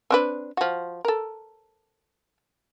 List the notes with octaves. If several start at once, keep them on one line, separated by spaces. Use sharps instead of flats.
C4 D4 B4
F3 F#4
A4 A#4